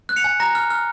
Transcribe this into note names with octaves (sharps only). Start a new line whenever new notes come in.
F#6
C#7 F7
G#5
A#5 A#6
F6
F6